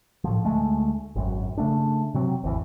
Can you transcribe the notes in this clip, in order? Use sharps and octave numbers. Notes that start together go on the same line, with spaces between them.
A2 F3
D2 G#3 A3
G#1 F#2
C#3 A3 D4
C3 F#3 C4
G#1 E2 E3